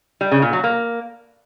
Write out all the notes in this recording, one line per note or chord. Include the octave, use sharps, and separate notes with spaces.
G3
C#3
A#2
F#3
A#3